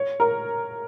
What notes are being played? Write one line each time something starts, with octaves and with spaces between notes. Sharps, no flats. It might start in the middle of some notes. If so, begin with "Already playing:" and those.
Already playing: C#5
A#4